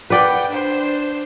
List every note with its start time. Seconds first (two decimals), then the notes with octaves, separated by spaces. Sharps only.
0.10 B4 D5 F#5 G5
0.51 D4 C5